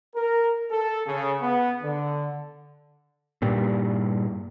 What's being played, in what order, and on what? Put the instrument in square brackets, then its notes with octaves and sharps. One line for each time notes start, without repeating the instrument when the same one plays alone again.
[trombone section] A#4
A4
C#3
B3
D3
[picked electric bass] G2 A#2 G3